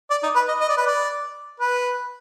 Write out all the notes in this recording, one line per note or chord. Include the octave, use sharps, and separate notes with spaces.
D5
D#4
B4
D#5
D#5
D5
B4
D5
B4